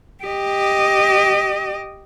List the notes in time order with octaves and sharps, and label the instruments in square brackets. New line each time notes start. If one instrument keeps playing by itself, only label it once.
[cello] G4 D#5